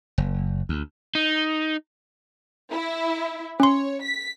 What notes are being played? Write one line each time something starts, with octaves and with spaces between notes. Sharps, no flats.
F#1
D2
D#4
E4 E5
C#4 C#5 C6
B6